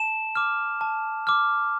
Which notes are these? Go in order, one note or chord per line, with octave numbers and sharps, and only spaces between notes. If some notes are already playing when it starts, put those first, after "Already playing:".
Already playing: A5 E7
D6 F6
A5
D6 F6